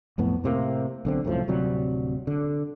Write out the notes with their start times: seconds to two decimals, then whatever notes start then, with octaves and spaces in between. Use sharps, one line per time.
0.18 B1 F2 A2 B3
0.44 A2 C3 A#3
1.05 B1 D3 C4
1.24 C2 F#2 A2 F3
1.48 D1 C3 F#3 G3
2.27 D3